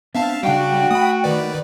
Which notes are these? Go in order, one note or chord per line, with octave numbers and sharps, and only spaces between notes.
B3 C4 D4 E5 F5 A5
C#3 G3 D4 F#4 F5 G5
A3 B5 D#6
D#3 B4 D5